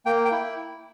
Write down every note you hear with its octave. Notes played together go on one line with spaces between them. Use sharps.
A#3 G5
G5
E4